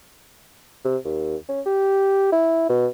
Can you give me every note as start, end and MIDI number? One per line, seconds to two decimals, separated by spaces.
0.85 0.97 48
1.05 1.36 39
1.48 1.61 61
1.66 2.29 67
2.32 2.65 64
2.70 2.87 47